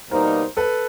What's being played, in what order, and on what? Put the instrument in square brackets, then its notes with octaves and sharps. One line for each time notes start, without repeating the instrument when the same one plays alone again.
[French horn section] B2 G3 A#3 D#4 [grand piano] A#4 C5
[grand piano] A4 B4